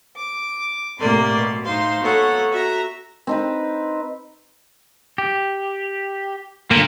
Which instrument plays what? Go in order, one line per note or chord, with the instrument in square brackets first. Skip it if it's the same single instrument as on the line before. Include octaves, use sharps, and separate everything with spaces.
[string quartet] D6
A2 C3 A#3 D5 C6
B2
A2 D#4 C5 F5 C6
A#3 B3 F#4 A4 C#5 F#5
F#4 E5 A#5
[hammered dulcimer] C4 D#4 B4
[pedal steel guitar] G4
[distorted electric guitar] A#2 [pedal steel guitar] D3 A#3